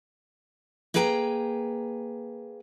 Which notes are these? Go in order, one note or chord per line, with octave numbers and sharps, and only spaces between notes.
A#3 G#4 B4 G5 A5 A#5